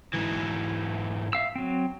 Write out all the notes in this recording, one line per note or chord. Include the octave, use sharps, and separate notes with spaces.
G#2 E3
E5 F5 E6
F#3 C4